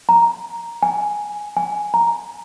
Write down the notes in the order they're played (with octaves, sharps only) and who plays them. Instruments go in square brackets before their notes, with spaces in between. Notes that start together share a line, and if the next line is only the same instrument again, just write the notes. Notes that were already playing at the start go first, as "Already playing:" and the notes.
[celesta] A#5
G#5
G#5
A#5